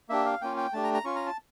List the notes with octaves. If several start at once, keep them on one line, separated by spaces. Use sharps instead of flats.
A#3 D4 G4 E5
F5
A#3 C#4 F4 G5
G5
A3 D4 G4 A5
A#5
A#5
C#4 F4 C#6
A#5
A5